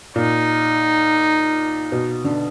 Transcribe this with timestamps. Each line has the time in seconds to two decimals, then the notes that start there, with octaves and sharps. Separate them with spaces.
0.16 A#2 D#4
1.92 B2
2.24 D3